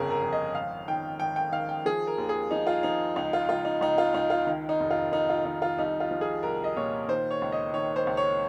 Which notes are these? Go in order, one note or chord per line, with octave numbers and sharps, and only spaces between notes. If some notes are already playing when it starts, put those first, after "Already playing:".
Already playing: G1 F2 C#3 G#4 A#4
A#4
F2
D#5
G#1 F5
D#3 G5
G#1 G5
G5
D#3 F5
G5
F3 G#4
A#4
D#2
G#4
F3 D#4
F4
F3 D#4
C#2 D#4
F4
C#2 F4
D#4
C#2 D#4
F4
C#2 D#4
F4
D#3
D#4
F1
F4
F1 D#4
F4
D#3 D#4
F4
C2 D#4
F4
F3
G#4
C2 A#4
D#5
A#2 C#5
D#3 C5
C#5
C#2
D#5
D#3 C#5
C5
C#2
C#5